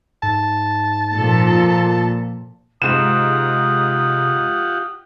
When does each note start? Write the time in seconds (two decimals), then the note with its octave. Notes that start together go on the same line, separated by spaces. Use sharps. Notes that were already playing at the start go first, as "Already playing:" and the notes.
0.23 G#2 A5
1.15 A#2 F3 A#3 A4
2.82 G#2 C3 F4 G4 F#5 D#6 E7